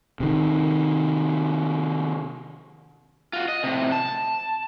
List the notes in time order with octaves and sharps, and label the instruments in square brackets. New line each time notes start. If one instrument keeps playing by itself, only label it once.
[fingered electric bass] C3 D#3
[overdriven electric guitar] F4 F#4
D#5
A2 C3
A5